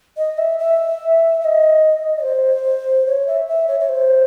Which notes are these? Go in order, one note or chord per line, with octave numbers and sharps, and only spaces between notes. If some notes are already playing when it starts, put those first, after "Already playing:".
D#5
E5
E5
E5
D#5
C5
C#5
E5
E5
C#5
C#5
C5